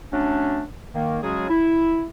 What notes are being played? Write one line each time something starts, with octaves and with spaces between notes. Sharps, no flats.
F#3 A3 C#4 D4
D#3 A#3
C#3 F#3 G#3 C#4 F#4 G#4
E4